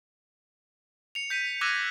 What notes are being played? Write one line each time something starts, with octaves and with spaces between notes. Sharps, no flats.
C#7 F7
G6 B6 C#7 D#7
D6 E6 F#6 G#6 A#6 D#7